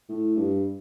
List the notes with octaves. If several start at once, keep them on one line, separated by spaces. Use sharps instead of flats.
A2
G2